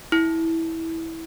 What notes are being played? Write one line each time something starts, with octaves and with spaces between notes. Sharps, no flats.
E4